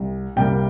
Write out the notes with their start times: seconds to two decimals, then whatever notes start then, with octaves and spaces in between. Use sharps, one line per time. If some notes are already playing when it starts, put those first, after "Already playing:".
Already playing: C2
0.36 C2 C3 G3 A#3 G5